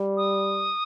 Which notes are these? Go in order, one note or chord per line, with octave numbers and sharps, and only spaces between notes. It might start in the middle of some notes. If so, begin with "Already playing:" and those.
Already playing: G3
D#6